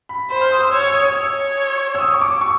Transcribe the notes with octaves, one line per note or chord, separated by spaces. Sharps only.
B5
C5 B5
F6
D#6
E6
C#5 E6
E6
D#6
D#6
C#5 E6
E6
D#6
C#6
D6
C#6